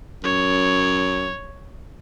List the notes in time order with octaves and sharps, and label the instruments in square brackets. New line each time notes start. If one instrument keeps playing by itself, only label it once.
[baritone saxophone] F#2 [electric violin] C#5